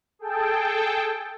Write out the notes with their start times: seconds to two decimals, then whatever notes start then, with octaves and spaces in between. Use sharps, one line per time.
0.19 G#4 A4 G5 A5